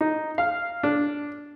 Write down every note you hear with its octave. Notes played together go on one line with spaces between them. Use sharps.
D#4
F5
D4